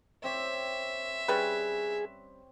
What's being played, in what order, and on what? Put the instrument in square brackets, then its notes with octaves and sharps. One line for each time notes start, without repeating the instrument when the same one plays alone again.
[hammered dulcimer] C4 G4 C#5 [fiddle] E5
[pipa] G3 C#4 B4 [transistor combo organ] G#4